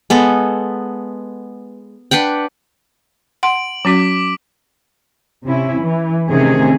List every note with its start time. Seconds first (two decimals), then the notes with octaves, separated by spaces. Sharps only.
0.10 G#3 B3 A4
2.11 D4 B4 F#5 G5
3.43 F#5 C6 D7 F#7
3.85 F#3 C#4 F#4 D6 B6
5.45 C3 C#4 E4
5.80 E3
6.30 C3 D#3 A3 C#4 G#4